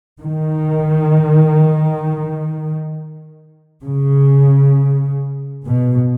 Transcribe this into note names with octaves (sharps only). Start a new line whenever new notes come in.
D#3
C#3
B2